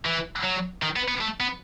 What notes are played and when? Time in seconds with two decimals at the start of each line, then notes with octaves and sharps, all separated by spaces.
0.05 E3
0.43 F#3
0.82 D#3
0.96 B3
1.08 B3
1.21 A3
1.40 B3